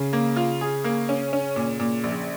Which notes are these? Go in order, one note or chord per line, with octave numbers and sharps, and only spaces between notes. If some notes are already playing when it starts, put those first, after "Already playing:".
Already playing: C#3 C#4
A#3
F4
G#4
A#3
C#4
C#4
A#2
A#2
A#1